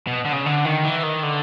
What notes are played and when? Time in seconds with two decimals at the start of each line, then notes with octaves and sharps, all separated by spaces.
0.07 B2
0.25 D3
0.33 C#3
0.46 D3
0.65 D#3
0.84 E3
1.03 D#3
1.23 D3